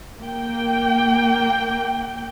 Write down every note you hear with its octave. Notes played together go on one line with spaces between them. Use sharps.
A#3 G5